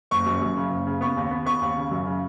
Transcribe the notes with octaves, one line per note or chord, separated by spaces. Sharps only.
F#1 C#6
F#2
F#2
C#3
F#1
C#3
B3 C#6
D#2
B3
B3 C#6
D#2
C#3
F#2
C#3